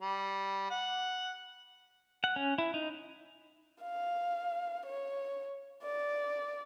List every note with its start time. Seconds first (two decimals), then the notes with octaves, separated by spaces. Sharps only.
0.01 G3
0.70 F#5
2.24 F#5
2.36 C#4
2.58 E4
2.74 D#4
3.82 F5
4.87 C#5
5.83 D5